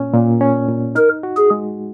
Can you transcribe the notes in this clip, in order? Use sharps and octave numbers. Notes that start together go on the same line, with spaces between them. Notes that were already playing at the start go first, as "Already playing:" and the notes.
Already playing: A#2 C#4
A#2
C#4
A#2
D#4 A#4
F#4
G#4
G#3